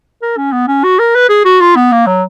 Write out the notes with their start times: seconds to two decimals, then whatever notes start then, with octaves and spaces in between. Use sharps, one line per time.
0.22 A#4
0.37 C#4
0.52 B3
0.68 C#4
0.84 F#4
0.99 A#4
1.15 B4
1.29 G#4
1.45 F#4
1.61 F4
1.76 B3
1.92 A#3
2.07 F#3